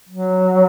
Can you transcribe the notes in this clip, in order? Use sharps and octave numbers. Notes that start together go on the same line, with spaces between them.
F#3